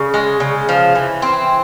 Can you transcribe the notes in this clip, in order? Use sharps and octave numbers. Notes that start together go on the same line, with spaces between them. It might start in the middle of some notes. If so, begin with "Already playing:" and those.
Already playing: C#3
G#3
C#3
F3
E3
C4